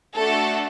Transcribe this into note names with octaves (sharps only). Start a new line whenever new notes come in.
A3 D4 F#4 A4